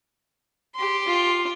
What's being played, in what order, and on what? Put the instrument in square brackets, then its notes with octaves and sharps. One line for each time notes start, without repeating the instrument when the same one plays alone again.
[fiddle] G4 C6
[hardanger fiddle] F4